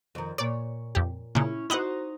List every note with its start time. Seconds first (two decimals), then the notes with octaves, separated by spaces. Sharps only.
0.15 F2 D#3
0.38 A#2 C#5 D5
0.95 F2 G4
1.35 A#2 C#3 C#4 E4
1.70 D#4 E4 F#4 C5 D#5 F#5